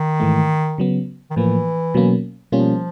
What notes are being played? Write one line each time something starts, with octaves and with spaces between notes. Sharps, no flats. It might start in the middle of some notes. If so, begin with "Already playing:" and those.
Already playing: D#3
G#2 E3 A3
C#3 F#3 B3
D#3
A2 E3 F3 A#3
B2 F#3 A#3 C#4
B2 F3 G3 A#3 C#4 F4